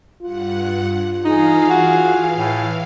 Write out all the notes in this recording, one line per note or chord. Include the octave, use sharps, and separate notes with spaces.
G2 F4 F#5
E3 D#4 G#4 F5
F#4
A2